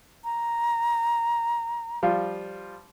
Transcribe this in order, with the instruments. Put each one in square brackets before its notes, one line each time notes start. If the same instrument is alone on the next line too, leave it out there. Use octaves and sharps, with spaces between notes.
[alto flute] A#5
[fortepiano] F3 G3 F4